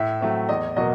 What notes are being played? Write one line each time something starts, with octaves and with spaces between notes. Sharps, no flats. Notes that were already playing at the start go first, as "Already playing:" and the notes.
Already playing: A2 E5
F#3 A3 C4
E2 D#5
B2 F#3 A#3 D#5